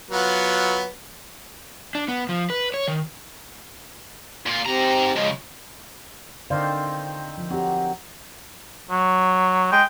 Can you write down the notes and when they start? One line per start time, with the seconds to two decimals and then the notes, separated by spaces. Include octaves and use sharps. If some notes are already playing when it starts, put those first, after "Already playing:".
0.11 F#3 B3 F4
1.95 D4
2.08 B3
2.29 F3
2.50 B4
2.74 C#5
2.88 D#3
4.46 A#2 F4
4.65 G#2 C4 G4 A#5
5.16 C#3 F3 G#3 D#5
6.50 D3 D#3 C4 C5 D5 F5
7.38 F3
7.50 F#3 C4 G4
8.90 F#3
9.72 G#3 G5